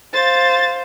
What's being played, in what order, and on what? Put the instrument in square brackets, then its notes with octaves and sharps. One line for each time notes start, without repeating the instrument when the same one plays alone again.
[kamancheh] C5 F5 [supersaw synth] A6